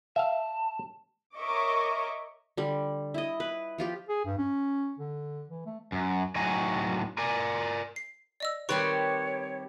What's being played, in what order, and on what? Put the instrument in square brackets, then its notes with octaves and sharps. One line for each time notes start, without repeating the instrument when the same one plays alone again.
[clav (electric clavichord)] E5 F5 [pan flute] A5
[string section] A#4 C#5 D#5 E5 C#6 D6
[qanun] D3 G3
E4 D#5
B4
F3 F4 G4
[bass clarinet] G#4
G2
C#4
D3
E3
A3
[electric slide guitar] F#2
A2 F#3 D#4 F#4 G#5
A#4 D5 G#5
[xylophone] C7
D5 D#5 E6
[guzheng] D#3 G3 C4 [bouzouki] G4 B4 [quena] C#5 [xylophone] C#6